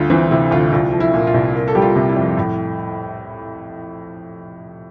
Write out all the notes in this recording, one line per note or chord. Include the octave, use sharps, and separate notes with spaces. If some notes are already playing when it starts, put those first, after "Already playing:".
Already playing: D2 G2 F4
E3 C4
C3 E4
D2 F4
C2 F4
F3
E4
A#2
F4
C2
A#3
A4
G3 G4
F4
C3
E4
F2
A2